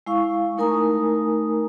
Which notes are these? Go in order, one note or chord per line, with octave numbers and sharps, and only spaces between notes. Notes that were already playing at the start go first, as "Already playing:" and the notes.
G#3 E4 F5 C#6
A3 D#4 A#4 G#5 A#5 D#6